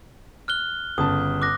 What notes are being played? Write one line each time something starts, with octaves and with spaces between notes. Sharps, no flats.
F6 F#6 G7
G1 C#3 A5 D#6
D6 F#6 A#6